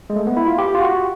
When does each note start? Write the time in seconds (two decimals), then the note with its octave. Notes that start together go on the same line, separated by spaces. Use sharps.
0.10 G#3
0.16 A3
0.27 B3
0.37 E4
0.47 F4
0.58 G4
0.75 F4
0.81 F#4